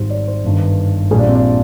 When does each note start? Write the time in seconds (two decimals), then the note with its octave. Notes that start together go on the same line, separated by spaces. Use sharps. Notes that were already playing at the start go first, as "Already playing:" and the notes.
Already playing: G#1 G#2 G3 C5
0.10 D5
0.28 C5
0.44 G1 G2 D#3
1.11 A#1 A#2 G3 G#4
1.19 D4
1.28 C4
1.35 D4